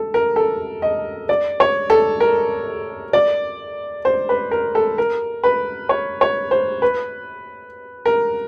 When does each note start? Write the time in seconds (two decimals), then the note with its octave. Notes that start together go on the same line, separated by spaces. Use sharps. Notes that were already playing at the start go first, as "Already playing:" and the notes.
Already playing: A4
0.14 A#4
0.36 A4
0.82 D#5
1.29 D5
1.60 C#5
1.90 A4
2.20 A#4
3.13 D5
4.05 C5
4.29 B4
4.51 A#4
4.75 A4
4.98 A#4
5.44 B4
5.89 C#5
6.21 C#5
6.51 C5
6.82 B4
8.06 A#4